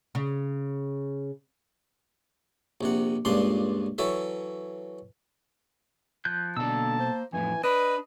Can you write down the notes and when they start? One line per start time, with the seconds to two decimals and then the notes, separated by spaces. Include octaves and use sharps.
0.15 C#3
2.81 A#1 C3 F#5
3.25 C#2 G2 A#2 D4 C6
3.98 E3 F#3 A4 C#5 E5
6.25 F3 F#6 G6
6.57 B2 D3 A#3 A4 A5 E6
7.00 C5
7.33 F2 A2 E3 G#5
7.64 D4 B4 D#5 B5